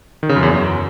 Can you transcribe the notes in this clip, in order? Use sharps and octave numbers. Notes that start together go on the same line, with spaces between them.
D#3
C#3
F#2
E2
F#2